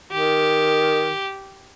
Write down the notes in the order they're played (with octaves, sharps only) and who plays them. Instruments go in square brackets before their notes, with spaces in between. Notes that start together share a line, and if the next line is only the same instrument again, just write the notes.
[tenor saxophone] D#3 [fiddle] G4